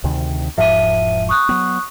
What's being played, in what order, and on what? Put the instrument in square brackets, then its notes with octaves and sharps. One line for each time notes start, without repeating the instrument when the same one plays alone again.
[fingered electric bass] D2 C3 D#3
[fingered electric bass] E1 G#2 F3 [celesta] E5 D#7
[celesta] C#6 D#6 F#6
[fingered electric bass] F#3 B3